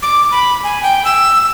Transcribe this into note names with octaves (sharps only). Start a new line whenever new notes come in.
D6
B5
G#5
G5
E6